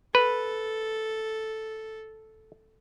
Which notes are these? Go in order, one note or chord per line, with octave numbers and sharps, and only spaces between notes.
A4 B4